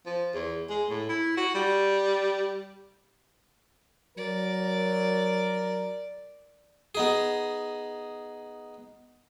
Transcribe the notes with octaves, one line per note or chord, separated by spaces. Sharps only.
F3
E2
G#3
A2
E4
F#4
G3
F#3 A#4 D5
B3 D#4 G#4